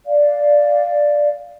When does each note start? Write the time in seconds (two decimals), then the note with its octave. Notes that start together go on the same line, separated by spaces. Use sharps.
0.06 D5 F5